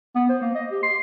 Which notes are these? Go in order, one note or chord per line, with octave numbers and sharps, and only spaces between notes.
B3
C5
A#3
D#5
G4
C6